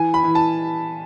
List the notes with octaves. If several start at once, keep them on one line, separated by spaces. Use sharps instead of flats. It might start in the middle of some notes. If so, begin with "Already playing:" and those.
Already playing: E3 G#5
B5
E3
A5